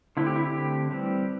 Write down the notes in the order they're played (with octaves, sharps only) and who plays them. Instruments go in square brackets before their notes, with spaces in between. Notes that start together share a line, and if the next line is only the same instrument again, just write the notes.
[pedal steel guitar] D3 A3 C4 E4
G4
E4
G4
E3 G3 C4